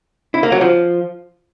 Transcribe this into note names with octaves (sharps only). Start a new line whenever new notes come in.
E4
A#3
F#3
F3